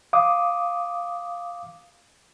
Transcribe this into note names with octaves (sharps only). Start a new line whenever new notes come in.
F5 D6 D#6